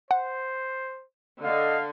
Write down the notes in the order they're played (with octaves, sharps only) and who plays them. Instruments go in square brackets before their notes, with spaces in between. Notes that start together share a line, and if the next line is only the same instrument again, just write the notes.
[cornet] C5 [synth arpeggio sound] F#5
[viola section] D3 [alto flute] D#5 [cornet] F5